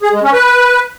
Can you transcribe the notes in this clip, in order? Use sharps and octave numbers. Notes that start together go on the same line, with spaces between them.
G#4
G#3
C#4
B4